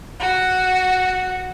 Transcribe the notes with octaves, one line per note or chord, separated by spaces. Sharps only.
F#4